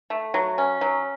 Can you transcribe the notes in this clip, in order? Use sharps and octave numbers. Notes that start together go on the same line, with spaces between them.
A3
F#3
C#4
F#3